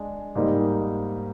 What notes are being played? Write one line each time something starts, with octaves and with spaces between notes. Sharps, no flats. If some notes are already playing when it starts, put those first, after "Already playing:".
Already playing: G#3 D4
G#2 G3 A#3 D#4